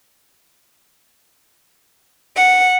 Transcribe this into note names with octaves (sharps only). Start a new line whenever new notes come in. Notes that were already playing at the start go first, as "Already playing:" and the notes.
F#5